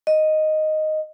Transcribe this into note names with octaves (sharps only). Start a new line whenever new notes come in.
D#5